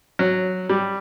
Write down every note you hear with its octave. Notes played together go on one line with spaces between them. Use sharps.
F#3
G3